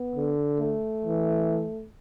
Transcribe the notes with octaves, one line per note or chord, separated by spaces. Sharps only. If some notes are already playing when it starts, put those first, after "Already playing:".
Already playing: B3
D3
A3
E3